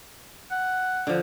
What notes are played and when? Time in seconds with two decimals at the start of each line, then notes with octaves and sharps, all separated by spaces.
0.51 F#5
1.07 D3 F3